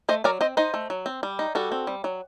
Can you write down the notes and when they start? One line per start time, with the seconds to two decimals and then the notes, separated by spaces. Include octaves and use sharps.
0.09 A3 C5 D#5
0.24 F#3 A#4 D5
0.41 C4 C5 D#5
0.57 D#4 C5 D#5
0.74 A3
0.90 F#3
1.06 C4
1.23 G3
1.39 D#4
1.55 G3 F#4 A4
1.72 C4
1.87 G3
2.04 F#3